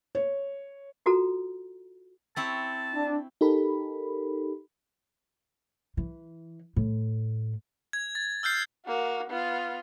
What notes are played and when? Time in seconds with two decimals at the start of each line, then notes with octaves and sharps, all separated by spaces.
0.15 C#5
1.06 F4 F#4 A4 A#5
2.36 C4 E4 C#5 A5
2.95 D4
3.41 D#4 G4 A4 A#4 B5
5.97 E3
6.76 A2
7.93 G#6
8.15 A6
8.43 E6 F6 G6 C7
8.86 A#3 F#4
9.30 B3 F4